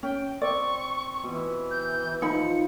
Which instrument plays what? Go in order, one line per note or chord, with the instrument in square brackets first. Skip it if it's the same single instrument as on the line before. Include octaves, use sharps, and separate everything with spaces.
[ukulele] C#4 [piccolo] G5
[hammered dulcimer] C4 [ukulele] D5 [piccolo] C#6
[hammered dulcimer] B2 [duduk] E3
[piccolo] G6
[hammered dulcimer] F3 [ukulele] D#4 B5 [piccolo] C#7